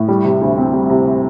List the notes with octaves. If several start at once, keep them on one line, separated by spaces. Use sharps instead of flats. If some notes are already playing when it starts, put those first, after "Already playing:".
Already playing: A2
G3
C3
D2
C4
G3
C3